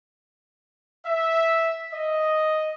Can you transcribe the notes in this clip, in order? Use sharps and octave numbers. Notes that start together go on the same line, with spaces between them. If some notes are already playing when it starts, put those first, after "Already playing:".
E5
D#5